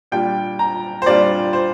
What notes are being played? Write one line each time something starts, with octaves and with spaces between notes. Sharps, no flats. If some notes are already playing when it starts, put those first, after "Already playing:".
A#2 G3 D4 F4 G5
A#5
C5
A#2 G3 D4 F4 D5
C5